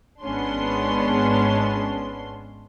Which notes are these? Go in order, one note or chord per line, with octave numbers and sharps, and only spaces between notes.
G#1 G#3 B3 C#4 D4 C6